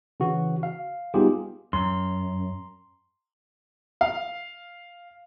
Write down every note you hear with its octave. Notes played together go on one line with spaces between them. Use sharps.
C#3 E3 F#4
F5
G3 B3 D#4 F4 G4 G#4
F#2 A#5 C6
F5